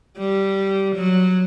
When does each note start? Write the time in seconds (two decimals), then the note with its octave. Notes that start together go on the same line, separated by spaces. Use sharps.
0.18 G3
0.96 F#3